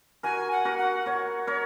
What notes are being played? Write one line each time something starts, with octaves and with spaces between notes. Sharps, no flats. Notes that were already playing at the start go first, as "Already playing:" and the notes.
F#4 A#4 G#5
F#5
F#4 A#4
F#5
A#4 C#5
A#4 C#5